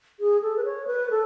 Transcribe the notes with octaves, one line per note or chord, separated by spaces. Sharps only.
G#4
A4
B4
C#5
B4
A4